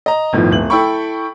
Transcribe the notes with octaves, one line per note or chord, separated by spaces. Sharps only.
D#5 A#5
G1 A2 D#3 F3
D1 F#7
E4 A4 G5 B5 C#6